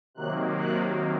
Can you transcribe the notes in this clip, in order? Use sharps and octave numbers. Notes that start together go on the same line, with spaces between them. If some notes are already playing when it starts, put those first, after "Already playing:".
C3 D#3 F#3 A#3 F#6
F#6